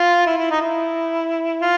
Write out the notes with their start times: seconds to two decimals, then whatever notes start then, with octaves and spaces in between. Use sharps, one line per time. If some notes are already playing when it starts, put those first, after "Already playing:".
Already playing: F4
0.26 E4
0.38 E4
0.51 D#4
0.61 E4
1.62 F4